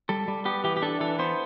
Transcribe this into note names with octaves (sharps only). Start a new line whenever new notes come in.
G3 A4
G3
B3 G4
E3 G4
G4
D4 A4
E3 A4
B3 C5